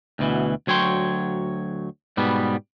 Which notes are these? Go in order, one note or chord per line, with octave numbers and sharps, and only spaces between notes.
D2 B2 E3
D2 F#3 C#5 G5 C6
G#2 B2 G3 B3